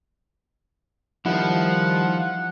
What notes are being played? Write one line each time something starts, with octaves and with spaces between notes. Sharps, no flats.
D#3 F3 G3 E4 F#5